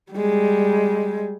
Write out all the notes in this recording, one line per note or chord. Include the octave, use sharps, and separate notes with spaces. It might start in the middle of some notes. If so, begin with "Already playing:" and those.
G3 G#3